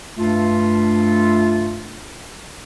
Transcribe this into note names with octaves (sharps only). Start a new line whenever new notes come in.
G2 A3 F4